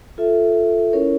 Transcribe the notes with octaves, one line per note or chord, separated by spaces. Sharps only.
F4 A4 E5
C#4 E4 A#4 C#5